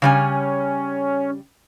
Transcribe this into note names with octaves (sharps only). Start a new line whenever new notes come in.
C#3 G3 C#4 G#5